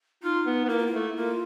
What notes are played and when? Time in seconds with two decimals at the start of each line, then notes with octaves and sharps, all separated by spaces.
0.23 D#4 F4
0.46 B3
0.65 B3
0.69 A#3 E4
0.78 F4
0.86 E4
0.93 A3
1.16 A#3 F4